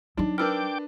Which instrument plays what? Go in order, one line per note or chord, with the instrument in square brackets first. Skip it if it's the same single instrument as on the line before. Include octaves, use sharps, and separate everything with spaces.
[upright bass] F#3 D#4 [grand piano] D4
[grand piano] D4 B4 [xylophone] A#4 E6 F6 [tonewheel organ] G5 D6